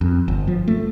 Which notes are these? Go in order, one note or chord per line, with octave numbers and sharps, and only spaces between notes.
F2
G1
F3
A3